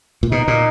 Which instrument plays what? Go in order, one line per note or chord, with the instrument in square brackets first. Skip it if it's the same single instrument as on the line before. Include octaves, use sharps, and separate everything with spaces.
[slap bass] A#2
[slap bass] B2 [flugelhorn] D#4
[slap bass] A#2